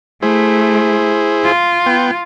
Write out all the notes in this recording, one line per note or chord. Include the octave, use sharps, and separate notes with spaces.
A3 E4 G#4 C5
F4
B3 G5